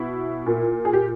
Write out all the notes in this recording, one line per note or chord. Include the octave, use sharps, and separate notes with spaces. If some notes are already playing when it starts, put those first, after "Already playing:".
Already playing: B2 E4
A#2
G#4
G4